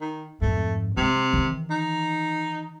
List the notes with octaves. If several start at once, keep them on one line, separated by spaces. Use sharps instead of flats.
D#3
F2 G#2 A3
C3 G#3 C4
D#3 E3
D#4